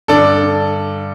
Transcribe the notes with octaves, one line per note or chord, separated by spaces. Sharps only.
G2 D3 A4 D5